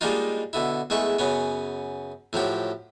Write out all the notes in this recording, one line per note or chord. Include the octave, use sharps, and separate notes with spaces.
G3 G#3 A#3 D4 D#4 F4
B2 D3 E4
E2 G#3 A3 E4 C#6
F#2 C#3 B3 C#4
A2 F3 F#3 G4